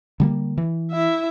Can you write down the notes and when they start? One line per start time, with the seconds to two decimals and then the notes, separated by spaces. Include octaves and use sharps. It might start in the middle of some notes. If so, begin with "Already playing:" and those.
0.20 D3 G3 A#3
0.58 E3
0.92 E4 E5